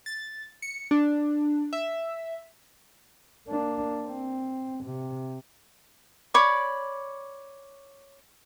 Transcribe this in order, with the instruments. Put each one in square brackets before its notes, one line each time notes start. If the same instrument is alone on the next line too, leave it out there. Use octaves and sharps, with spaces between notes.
[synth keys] A6
C#7
D4
E5
[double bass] A#3 D4
C4
C3
[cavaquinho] C#5 D5 B5 D6